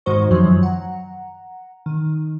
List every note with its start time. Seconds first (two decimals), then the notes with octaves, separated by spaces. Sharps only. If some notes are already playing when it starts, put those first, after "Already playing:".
0.06 G#2 D#3 G#3 F#4 C5 C#6
0.31 F#2 D#3 F3 F#3
0.63 F#5 A#5
1.86 D#3